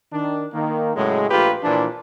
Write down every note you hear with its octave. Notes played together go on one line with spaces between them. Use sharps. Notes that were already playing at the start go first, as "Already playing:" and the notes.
D#3 D4
D#3 A#3
A2 C#3 F#3 G#3
A#1 A3 A#3 F4 G4 B4
A#2 E3 F3 D4